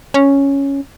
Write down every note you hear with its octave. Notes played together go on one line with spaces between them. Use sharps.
C#4